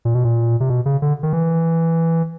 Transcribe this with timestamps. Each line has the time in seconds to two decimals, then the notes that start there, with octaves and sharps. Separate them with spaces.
0.05 A#2
0.14 B2
0.24 A#2
0.60 C3
0.69 B2
0.86 C#3
1.02 D3
1.23 D#3
1.33 E3